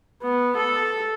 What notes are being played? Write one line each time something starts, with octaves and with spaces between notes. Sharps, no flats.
B3
A4